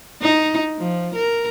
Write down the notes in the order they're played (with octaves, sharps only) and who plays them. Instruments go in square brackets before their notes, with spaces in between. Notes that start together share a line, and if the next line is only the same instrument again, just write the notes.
[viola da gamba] D#4
F3
A#4